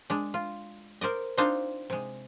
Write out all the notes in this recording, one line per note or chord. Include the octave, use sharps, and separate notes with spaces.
G#3 D4
F4
A#4 C5 D5 D#5
C4 D4 D#4 F4 C5 F5
C3 G#3